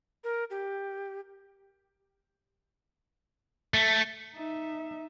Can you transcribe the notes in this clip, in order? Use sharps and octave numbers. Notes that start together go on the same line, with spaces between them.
A#4
G4
A3
D#4 E5